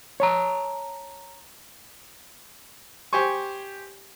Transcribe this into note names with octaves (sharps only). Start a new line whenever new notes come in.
C#5 A5 A#5
G4 C5 G#5 C#6